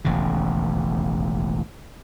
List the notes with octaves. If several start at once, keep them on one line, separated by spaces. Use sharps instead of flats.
E1 A1 D#2 C#3